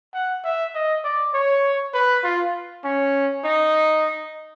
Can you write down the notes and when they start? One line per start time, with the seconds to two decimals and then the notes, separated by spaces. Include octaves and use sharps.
0.14 F#5
0.44 E5
0.74 D#5
1.04 D5
1.34 C#5
1.94 B4
2.24 F4
2.84 C#4
3.44 D#4